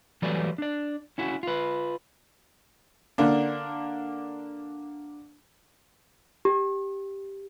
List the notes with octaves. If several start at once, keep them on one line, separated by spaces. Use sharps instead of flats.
E3 F#3 G3 A3 B4 D5
D4 D5
C#4 E4 F#4
F4 B4
D3 A#3 D4
G4